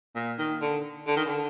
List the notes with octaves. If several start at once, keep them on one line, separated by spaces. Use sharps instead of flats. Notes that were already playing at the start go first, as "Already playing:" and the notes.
A#2
D#3
D3
D3
D#3
D3